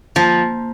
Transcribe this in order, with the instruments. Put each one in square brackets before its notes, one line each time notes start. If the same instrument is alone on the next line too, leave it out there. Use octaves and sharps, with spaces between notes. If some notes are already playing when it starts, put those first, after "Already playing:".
[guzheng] F3 [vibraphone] A#3